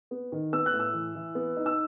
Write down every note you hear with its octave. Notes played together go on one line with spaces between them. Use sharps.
B3
D#3
B3 E6
F#6
A2
E6
E3
E3
B3
D#4
E6